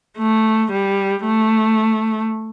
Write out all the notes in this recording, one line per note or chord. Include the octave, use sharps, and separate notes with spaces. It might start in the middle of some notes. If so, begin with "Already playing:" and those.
A3
G3
A3